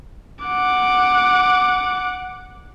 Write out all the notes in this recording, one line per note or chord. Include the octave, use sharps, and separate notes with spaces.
F#5 D6